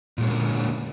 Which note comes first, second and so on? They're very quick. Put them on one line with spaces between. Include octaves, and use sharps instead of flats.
A#2 G#3 C#4 D3 A#3